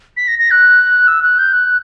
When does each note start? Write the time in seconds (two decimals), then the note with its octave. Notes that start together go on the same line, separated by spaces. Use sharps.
0.17 B6
0.28 A#6
0.39 A#6
0.51 F#6
1.08 E6
1.23 F#6
1.38 G6
1.53 F#6